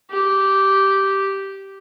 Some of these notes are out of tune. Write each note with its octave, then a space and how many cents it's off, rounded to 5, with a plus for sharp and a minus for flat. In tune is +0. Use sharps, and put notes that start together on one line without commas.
G4 -10